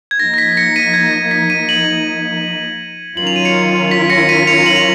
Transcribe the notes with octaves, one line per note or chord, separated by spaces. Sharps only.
G#6
F3 A#3 D#4 A#6
A#6
B6
A#6 C#7
B6 D#7
G#6
A#6
B6
B6 D#7
D#7 F#7
D#3 F#3 C#4 F4 A#4 F#7
F7
D#7
C#7 F7
B6
A#6 C#7
B6 D#7
C#7 F7
D#7 F#7
F7